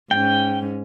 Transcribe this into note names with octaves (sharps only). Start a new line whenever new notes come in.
G#2 C#4 G5